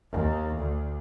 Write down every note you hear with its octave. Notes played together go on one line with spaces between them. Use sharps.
D#2
D2